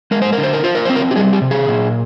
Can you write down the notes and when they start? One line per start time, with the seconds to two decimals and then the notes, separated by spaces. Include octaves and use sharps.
0.11 G#3 A#4
0.22 C5
0.32 A#4
0.38 D3
0.43 C5
0.53 A#4
0.64 F4 C5
0.75 A#4
0.85 C4 C5
0.96 A#4
1.11 G4
1.16 G3 G#4
1.33 G4
1.42 C3
1.51 G#4
1.68 A#2